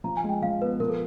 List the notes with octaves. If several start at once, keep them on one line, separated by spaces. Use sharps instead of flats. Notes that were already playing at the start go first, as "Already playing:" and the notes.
F3 A#5
G#5
G#3
G5
F3 F5
B3 B4
F3 A#4
A4